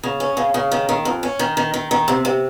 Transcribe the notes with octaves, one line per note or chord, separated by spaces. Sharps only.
C#3
C#4
C#3
C#3
D#3
D#3
F2
C#4
D#3
D#3
D#3
D#3
C3
C3